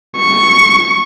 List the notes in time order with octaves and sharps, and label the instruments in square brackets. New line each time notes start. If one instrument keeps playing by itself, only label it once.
[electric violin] C#6